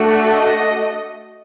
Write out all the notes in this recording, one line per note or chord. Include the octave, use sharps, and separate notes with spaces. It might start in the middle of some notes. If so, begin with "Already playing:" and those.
Already playing: A3 D4 F#4 A4
D#5